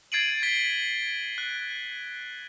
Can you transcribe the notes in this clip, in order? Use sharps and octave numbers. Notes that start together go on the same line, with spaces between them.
G#6 A6 C7 D7 D#7 F#7
G#6 B6 G7
F#6